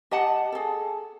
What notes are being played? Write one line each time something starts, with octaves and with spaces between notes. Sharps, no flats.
G4 D#5 F#5 A5
G#4 A4